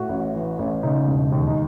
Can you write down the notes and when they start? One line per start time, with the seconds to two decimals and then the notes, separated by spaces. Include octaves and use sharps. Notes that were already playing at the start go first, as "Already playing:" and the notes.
Already playing: A2 F#4
0.09 A1
0.34 E3
0.59 A1
0.83 C#3 D#4
1.08 E1
1.32 D#2
1.47 D#4